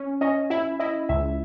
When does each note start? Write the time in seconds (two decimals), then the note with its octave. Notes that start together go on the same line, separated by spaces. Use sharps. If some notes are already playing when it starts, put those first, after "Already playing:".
Already playing: C#4
0.21 C#4 D#5
0.50 E4 E5
0.79 E4 D#5
1.09 C#2 E5